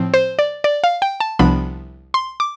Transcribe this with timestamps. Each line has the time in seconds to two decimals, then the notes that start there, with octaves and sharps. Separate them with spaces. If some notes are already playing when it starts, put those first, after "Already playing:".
Already playing: A2 F3 C4
0.14 C5
0.39 D5
0.64 D5
0.84 F5
1.02 G5
1.20 A5
1.39 C2 C3 F3 B3 D4 B5
2.14 C6
2.40 D6